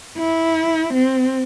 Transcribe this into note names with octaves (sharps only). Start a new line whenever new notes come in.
E4
C4